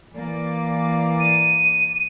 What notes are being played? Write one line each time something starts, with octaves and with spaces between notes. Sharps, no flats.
E3 A#3 D5
D#7